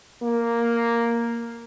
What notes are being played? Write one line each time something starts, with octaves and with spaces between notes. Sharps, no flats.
A#3